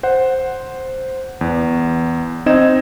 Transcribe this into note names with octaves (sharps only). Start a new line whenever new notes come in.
C5 F#5
E2
C4 D#4 D#5 G5 G#6 E7